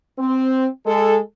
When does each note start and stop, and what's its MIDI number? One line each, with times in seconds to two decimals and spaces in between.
0.19 0.66 60
0.86 1.19 56
0.86 1.19 69